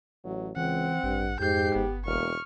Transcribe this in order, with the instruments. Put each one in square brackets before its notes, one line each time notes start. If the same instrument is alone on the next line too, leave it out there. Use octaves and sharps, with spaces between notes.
[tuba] A1 [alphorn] F#3
[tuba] C#2 [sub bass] E3 [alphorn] C4 [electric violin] F#5
[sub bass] A1 [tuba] G2
[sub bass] F2 [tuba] G#2 [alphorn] G4 [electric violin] G6 C7
[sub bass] G1 [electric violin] B3
[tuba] E1 [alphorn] A#3 [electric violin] C#6 F6